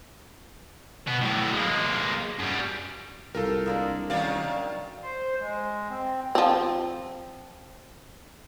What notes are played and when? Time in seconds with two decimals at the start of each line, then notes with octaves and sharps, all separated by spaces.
1.07 B2 B3
1.21 A2 F#3
1.53 G#3 A#3
2.39 F#2 G3
3.35 C2 F4 G4 A4 A#4
3.66 G#3 A#3 D4
4.10 D#3 F#3 A3 C#4 D4 D5 F5
5.02 C5
5.40 G#3
5.89 C4
6.35 F3 C4